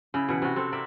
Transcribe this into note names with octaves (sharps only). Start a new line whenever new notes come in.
C#3 E4
B2 E3 F#5
C3 F#4
C4 A4
A#3 D5 E5